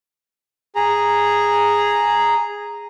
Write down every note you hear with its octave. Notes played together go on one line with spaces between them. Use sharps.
G#4 A#5